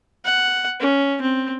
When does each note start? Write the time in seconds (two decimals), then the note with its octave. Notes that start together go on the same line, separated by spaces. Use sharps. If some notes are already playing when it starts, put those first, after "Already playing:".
0.25 F#5
0.80 C#4
1.21 C4